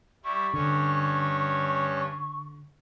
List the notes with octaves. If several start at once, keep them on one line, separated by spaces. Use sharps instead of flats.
G3 E4 C#6
G2 D3 C#4 C#5